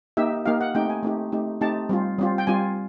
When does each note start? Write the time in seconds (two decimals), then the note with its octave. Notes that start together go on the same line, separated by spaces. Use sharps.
0.17 A#3 D#4 G4 E5
0.46 A#3 D#4 G4 F5
0.61 F#5
0.75 A3 C4 D#4 G4 G5
0.90 G#5
1.03 A3 C4 D#4 G4
1.32 A3 C4 D#4 G4
1.61 A3 C4 D#4 G4 A5
1.89 G3 C4 F4
2.18 G3 C4 F4
2.38 G5
2.47 G3 C4 F4 G#5